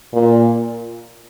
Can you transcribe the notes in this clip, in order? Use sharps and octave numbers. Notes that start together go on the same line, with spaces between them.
A#2